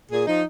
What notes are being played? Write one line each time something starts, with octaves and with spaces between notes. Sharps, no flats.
A#2 G#4
F3 D#4